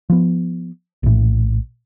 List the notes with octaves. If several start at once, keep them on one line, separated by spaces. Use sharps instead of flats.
F3 B3
A#1 A2